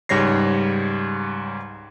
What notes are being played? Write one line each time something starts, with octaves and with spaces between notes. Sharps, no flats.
C#2 G#2 G3 C#5 A#6 C7